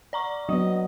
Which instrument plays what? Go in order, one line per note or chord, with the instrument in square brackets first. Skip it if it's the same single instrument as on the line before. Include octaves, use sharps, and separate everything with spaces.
[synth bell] D5 A#5 C#6
[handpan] F#3 B3 [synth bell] A#3 [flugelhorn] D#5